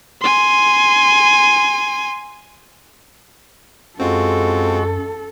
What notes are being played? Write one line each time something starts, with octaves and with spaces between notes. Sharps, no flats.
G#5 C6
F#2 G#3 C4 F4 F#4 A4